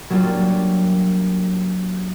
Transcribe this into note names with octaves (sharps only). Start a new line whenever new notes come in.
F#3 G3 A#3 D4 F4